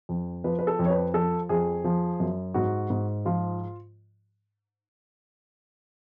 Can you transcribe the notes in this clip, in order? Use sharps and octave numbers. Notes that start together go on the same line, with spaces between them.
F2
F3 B4
B4
A4
F2
C#5
B4
F3 A4
F2 G#4
F3
F#2
G#2 F#4
G#2
F3 F4